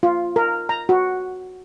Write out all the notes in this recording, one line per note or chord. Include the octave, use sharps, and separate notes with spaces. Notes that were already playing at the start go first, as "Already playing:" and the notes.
F4
A#4
A#5
F#4